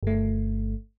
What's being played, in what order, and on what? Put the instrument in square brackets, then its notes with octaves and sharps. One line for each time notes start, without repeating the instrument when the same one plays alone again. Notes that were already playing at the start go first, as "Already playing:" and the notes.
[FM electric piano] G1 A3